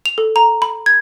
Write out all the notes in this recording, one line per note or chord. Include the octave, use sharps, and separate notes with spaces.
F7
A4
A#5
B5
G#6